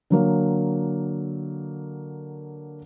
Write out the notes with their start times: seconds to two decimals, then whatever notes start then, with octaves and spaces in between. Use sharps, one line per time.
0.10 D3 F#3 A#3